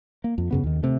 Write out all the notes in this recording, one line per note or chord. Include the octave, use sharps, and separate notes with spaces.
A#3
F2
F#2 C#3 B3
D#2 D#3
C3 A3